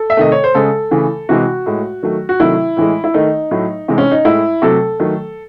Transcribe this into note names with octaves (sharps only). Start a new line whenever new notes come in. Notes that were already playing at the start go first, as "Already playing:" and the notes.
Already playing: A4
E5
C3 D#3 A3 D#5
C#5
C5
C#3 G#3 A4
C#3 E3 A3
C3 E3 G#3 F#4
A2 G#3
D#3 F#3 A3
F#4
C3 D#3 F#3 A3 E4
A2 E3 G#3
E4
D#3 A3 D#4
A2 F#3 A3
C3 E3 G#3
C#4
D#4
A2 G#3 E4
C3 F#3 A3 A4
D#3 F#3 A3